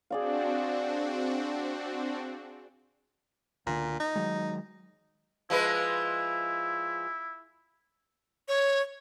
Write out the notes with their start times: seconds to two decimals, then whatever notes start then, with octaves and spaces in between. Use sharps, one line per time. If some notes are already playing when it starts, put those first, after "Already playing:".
0.10 C4 D4 F#4 G#4 D5 F5
3.66 C#2 A#2 D3
4.00 D#4
4.15 D#3 F#3 G#3
5.50 F3 G#3 E4 B4
8.48 C#5